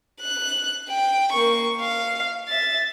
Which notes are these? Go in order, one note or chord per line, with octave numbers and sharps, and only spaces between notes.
F#6
G5
A#3 C#6
F5
E5 A6